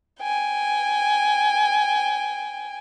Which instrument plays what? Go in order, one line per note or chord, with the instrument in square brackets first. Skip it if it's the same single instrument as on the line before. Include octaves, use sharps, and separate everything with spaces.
[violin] G5 G#5